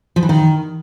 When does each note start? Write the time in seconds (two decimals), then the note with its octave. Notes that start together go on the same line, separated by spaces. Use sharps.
0.16 F3
0.23 E3
0.29 D#3